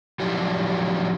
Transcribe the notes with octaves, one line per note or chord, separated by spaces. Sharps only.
F3 F#3 D4 E4 G4